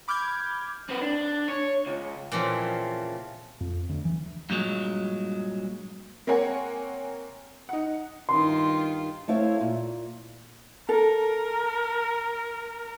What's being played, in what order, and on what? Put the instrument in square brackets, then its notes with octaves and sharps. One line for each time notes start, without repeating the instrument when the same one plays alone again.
[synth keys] B5 D6 F6 G6 G#6
[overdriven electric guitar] C4 B4
D4
C#5
C#2
[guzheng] A#2 C#3 E3 F3 C4
[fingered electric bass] F2
D2
E3
[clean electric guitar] G2 A#2 F#3 G#3
[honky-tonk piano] A#3 C4 A#4 C#5 F#5 G#5
D#4 F#5
[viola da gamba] G2 D#3 F4 [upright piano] C6
[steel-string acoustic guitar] A3 C4 E4 C#5 F5
A#2
[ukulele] A4 [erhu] A#4